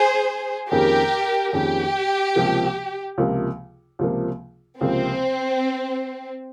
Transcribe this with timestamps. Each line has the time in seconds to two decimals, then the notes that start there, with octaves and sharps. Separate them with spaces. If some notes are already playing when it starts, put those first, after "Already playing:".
Already playing: G#4 C5
0.71 F2 D#3 A#3 C#4 G4 G#4 A#4
1.53 F2 D#3 A#3 C#4 G4 G#4
2.35 C#2 C3 F3 A#3
3.18 C#2 C3 F3 A#3
3.99 C#2 C3 F3 A#3
4.81 C#2 C3 F3 A#3 C4